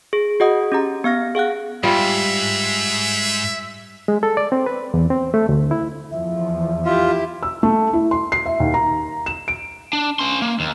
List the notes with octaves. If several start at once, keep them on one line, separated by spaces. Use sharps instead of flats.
G#4
F#4 G#4 D#5 F#5 D#6
C#4 G4 A#5
B3 F5 F6 A#6
G#4 F5 F#5 F#6
G#2 G3 F4 E5
G#3
A4
D5
C4
B4
E2
C4
A3
D2
E4
E2 F3 E5
E4 F4 G4
E6
A3
E4
C6
C7
E5
D#2
A#5
E7
D7
D4
C#4 C6
A#3
D#2